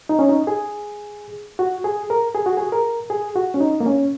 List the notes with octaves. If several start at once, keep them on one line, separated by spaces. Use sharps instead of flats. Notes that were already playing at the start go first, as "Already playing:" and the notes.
D#4
C#4
D#4
G#4
F#4
G#4
A#4
G#4
F#4
G#4
A#4
G#4
F#4
C#4
D#4
A#3
C#4